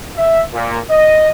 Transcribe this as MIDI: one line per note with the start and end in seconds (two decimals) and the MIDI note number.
0.16 0.42 76
0.53 0.78 46
0.90 1.30 75